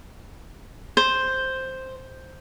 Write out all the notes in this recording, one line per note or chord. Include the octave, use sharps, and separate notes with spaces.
C5